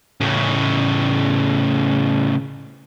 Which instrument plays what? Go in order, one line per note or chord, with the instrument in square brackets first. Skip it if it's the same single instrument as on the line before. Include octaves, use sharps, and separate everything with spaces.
[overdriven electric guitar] A2 C#3